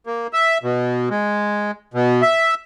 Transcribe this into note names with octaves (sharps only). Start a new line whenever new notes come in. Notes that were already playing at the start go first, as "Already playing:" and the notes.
A#3
E5
B2
G#3
B2
E5